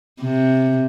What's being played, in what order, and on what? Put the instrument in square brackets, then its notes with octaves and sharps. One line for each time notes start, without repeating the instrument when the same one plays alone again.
[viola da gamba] C3